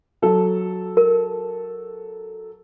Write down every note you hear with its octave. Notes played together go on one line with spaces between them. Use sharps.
F#3 A4
A#4